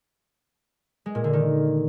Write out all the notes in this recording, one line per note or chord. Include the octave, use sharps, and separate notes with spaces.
G#3
A#2
D3
D#3